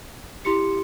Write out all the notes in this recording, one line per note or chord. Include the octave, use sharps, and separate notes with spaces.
E4 G4 C6 C#7